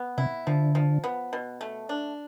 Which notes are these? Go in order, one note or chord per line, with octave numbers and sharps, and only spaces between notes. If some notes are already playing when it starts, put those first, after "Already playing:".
Already playing: B3
C3 E4
D3 F3
F3
B3
B2
A3
D4